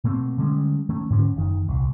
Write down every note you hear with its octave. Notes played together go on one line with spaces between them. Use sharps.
B2 A3 A#3 C4
D3 G3 G#3 C#4
D#3 A3 C#4
G#2 D3 C#4
F#1 D#3
D#1 C2